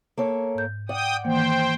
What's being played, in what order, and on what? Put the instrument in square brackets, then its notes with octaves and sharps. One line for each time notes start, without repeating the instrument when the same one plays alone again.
[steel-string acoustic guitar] A#3 A4 C#5
[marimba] G#2 G6
[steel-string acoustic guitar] D5 F#5 [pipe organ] G5 D#6
[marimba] D#3 E3 A#3 [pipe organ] C5 G5